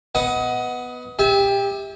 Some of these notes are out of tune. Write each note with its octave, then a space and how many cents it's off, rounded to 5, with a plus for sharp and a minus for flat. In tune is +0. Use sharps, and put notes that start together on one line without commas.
B3 +0 D#5 +25 F#5 +0
G4 +20 E5 -30 G#5 +40